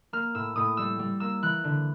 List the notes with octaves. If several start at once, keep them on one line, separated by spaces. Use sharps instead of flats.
A#3 F6
A2 E6
A2 D#6
G3 E6
G3
A#3 E6
E3 F#6
D3